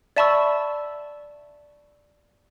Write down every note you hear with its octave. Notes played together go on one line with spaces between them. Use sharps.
D5 E5 A5 B5 C#6 E6